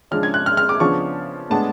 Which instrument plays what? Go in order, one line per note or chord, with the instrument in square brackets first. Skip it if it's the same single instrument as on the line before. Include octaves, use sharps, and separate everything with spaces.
[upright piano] C#3 F3 G#3 D4 F6
G#6
F#6
F6
F6
D6
C#3 F3 B3 D4 C#6
A2 G#3 B3 D4 A5